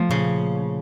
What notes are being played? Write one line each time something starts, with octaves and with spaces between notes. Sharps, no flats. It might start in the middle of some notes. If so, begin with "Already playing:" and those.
Already playing: F3 A3
A#2 C#3